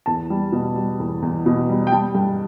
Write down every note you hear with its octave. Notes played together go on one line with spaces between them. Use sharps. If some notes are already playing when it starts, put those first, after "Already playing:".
E2 A5
G3
B2
G3
E2
E2
B2
G3
G5
G3 A5
G2